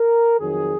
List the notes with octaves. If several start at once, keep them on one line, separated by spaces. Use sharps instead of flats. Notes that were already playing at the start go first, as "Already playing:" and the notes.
Already playing: A#4
F2 D#3 F#3 G#4